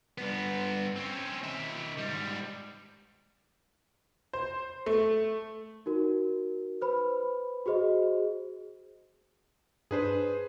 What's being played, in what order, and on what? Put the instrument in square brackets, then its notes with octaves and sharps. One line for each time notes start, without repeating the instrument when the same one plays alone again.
[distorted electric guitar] G2 B3
C4 C#4
D#3 E5
G#2 G3
[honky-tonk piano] C5
A3
[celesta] D#4 F#4 A#4
B4 C5 B5
F#4 G#4 C5 D#5
[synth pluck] G2 D4 [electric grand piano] G#4 B4 C5